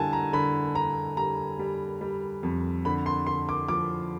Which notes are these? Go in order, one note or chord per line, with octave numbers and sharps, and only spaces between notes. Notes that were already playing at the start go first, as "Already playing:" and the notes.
Already playing: D3 G3 G#5 A5
A#5
D3 B5
D3 A#5
G3 A#5
G3
G3
F2
D3 B5
C6
D3 C6
D6
F3 D6